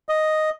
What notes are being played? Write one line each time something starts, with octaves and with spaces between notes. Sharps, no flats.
D#5